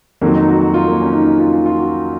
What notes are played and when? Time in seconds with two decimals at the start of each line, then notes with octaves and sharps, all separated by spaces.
0.21 F2 D#3 F#3 A#3
0.35 D#4
0.49 F#4
0.61 F#4
0.74 F4
0.88 A#3
1.01 C#4
1.14 D#4
1.26 D#4
1.40 F4
1.53 F4
1.66 F4
1.79 F#4